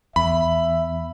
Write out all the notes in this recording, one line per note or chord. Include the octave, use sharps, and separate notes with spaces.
E2 E5 B5